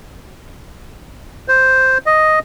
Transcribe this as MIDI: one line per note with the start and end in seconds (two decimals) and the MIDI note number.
1.48 1.98 72
2.06 2.39 75